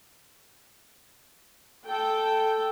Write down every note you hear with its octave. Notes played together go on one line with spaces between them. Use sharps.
A4 G5